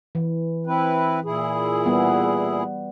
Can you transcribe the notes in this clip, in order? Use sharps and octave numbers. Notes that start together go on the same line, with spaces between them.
E3
C4 E4 B4
A#2 E4 G#4
G3 B3